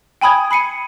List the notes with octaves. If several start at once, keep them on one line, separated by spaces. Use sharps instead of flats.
G5 G#5 B5 D#6 G#6
B5 C7 C#7 D#7